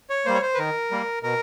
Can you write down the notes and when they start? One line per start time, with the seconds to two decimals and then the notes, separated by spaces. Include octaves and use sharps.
0.10 C#5
0.26 G3 A#3 C5
0.34 C#5
0.42 C5
0.54 B4
0.58 D#3 A#4
0.91 G3 A#3
1.23 B2 A#4